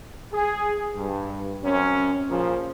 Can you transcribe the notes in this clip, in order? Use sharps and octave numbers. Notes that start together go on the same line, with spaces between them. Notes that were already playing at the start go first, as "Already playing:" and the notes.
G#4
G2
F#2 C4 C#4
A#2 C#3 F3